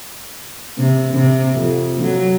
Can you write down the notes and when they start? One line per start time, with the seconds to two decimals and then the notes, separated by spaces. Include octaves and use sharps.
0.78 C3
1.13 C3
1.55 F2
2.02 F#3